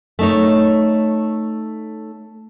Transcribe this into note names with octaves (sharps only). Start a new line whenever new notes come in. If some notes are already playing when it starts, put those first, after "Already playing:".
A3 D#4 C#5